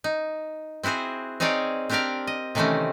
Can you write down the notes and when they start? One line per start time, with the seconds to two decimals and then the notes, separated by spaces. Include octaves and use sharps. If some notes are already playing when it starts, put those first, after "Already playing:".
0.04 D#4
0.83 C4 E4 F#4 G#4 C5
1.40 C4 D#4 G#4 C#5 D5 F5
1.89 C4 D4 G4 A#4 D5 F5
2.27 D#5
2.55 C3 D#3 E3 A3 C4 C#4